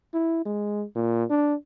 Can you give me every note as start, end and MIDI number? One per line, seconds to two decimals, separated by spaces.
0.14 0.41 64
0.46 0.84 56
0.96 1.24 46
1.30 1.54 62